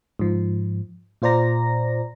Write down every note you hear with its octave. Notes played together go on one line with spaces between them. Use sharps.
G#2 F3
A#2 F4 C5 D5 A#5 A#6